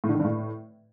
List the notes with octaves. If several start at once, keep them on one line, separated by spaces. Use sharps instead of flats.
A2
D3
D#3
G2
A2